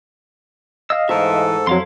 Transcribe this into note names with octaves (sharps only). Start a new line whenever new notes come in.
D#5 F5 E6
G#2 E3 A3 A4 C5 E5 A#5
F2 F#3 E4 F5 C6